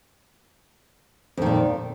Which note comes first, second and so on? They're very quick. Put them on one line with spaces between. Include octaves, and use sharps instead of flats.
F2 D#3 A#2